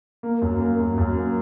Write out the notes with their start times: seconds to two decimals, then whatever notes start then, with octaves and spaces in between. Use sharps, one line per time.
0.23 A#3
0.42 F#2
0.61 A#3
0.80 F#2
0.98 F#2
1.17 A#3